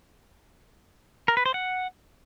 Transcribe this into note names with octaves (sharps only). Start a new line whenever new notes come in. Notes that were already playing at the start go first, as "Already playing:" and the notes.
A#4
B4
C5
F#5